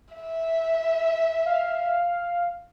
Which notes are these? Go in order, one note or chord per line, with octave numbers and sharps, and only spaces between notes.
E5
F5